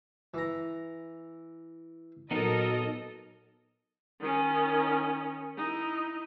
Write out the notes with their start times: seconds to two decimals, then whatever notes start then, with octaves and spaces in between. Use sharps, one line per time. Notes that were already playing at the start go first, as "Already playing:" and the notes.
0.34 E3 A#5
2.31 A#2 F#3 B3 D#4 A4 A#4 D#5
4.20 D#3 C#4
5.57 D#4 E4